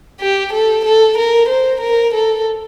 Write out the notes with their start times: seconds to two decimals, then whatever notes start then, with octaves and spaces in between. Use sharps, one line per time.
0.20 G4
0.53 A4
0.85 A4
1.17 A#4
1.49 C5
1.80 A#4
2.14 A4